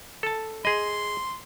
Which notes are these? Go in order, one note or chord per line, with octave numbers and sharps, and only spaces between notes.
A4 A5
G#4 D#5 C6